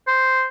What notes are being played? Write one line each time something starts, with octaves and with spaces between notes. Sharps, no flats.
C5